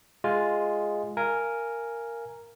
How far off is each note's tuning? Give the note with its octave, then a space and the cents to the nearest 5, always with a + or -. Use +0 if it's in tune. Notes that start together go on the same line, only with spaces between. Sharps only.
G#3 +0 F4 +0 G#5 +0
A#4 +0 F5 -30 G#5 +0